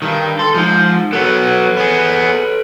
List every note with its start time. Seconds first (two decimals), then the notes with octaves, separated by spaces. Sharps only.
0.02 G2 D#3
0.39 A4 C6
0.54 F3 G#3 D#4
1.13 F#3 B3 A4 B4
1.77 B3 G#4